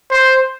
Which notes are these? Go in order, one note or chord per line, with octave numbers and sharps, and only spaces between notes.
C5